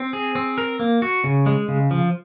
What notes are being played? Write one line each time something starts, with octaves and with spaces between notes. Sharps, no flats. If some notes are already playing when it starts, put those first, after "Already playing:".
Already playing: C4
G#4
C4
A#4
A#3
F#4
C#3
G#3
C#3
F3